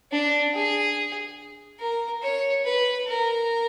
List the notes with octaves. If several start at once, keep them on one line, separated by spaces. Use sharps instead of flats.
D4
G#4
A#4
C#5
B4
A#4